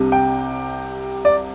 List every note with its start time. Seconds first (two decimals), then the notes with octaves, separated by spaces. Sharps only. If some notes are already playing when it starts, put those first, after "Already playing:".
Already playing: C2 C3 G3 D4
0.12 G5
1.25 D5